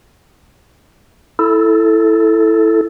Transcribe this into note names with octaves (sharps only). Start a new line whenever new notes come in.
E4 A4